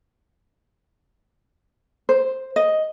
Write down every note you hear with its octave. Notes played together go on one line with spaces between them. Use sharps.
C5
D#5